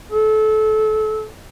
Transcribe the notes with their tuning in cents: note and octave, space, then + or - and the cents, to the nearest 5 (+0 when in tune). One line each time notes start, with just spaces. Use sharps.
A4 -25